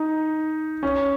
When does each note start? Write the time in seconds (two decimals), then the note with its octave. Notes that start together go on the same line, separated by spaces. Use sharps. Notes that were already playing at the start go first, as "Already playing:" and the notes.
Already playing: D#4
0.83 C#4